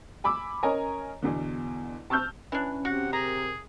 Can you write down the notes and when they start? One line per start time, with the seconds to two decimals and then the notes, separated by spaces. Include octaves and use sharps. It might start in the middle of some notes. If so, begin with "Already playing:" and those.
0.24 G#5 B5 D6 E6
0.63 C#4 A#4 C#5 D#5 G#5 A#5
1.22 E2 B2 D3
2.10 A5 C#6 E6 F6 G6
2.52 E3 C#4 D4
2.85 C3 F#4 F#5
3.13 G#4 A#4 A#5